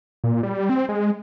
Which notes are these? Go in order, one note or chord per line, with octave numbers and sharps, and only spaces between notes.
A#2
G3
C4
G#3